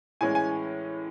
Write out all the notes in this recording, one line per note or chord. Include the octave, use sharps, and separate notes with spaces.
A2 E3 G#3 C#4 G#5
G#5